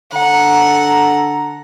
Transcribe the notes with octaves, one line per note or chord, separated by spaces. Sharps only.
D3 A4 F#5 A#5